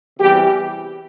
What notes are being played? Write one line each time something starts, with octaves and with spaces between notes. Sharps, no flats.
E2 C3 E3 G3 G4